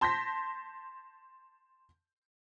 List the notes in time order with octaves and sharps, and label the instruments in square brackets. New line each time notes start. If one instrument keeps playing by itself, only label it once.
[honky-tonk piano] A5 C6 G6 A#6 B6